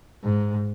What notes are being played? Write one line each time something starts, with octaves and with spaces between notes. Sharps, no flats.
G#2